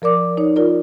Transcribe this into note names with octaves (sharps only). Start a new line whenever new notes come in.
F3 A#4 D5 D6
D#4 C#5
F4 A#4 D5